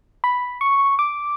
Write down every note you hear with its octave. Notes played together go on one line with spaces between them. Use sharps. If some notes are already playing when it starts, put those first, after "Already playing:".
B5
C#6
D6